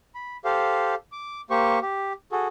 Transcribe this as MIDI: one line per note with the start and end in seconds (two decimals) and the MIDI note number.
0.15 0.37 83
0.45 0.95 67
0.45 0.95 69
0.45 0.95 72
0.45 0.95 77
1.12 1.41 86
1.50 1.79 58
1.50 1.79 67
1.50 1.79 72
1.50 1.79 85
1.82 2.13 67
2.32 2.48 66
2.32 2.48 68
2.32 2.48 69